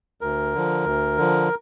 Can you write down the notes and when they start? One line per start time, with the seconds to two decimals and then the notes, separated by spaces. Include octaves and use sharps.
0.21 D2 A#4
0.54 D3 F3
0.86 D2
1.17 D3 F3